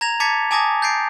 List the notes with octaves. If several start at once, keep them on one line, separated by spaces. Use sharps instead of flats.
A#5 G#6 A#6 F7
A5 D6 G#6 A6 B6 C#7
G#5 A5 D6 D#6 G#6 A#6
G6 A6 C7 D7